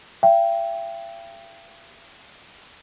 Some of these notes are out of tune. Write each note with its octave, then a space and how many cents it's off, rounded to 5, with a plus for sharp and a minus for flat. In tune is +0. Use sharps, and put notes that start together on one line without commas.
E5 +40 G5 +0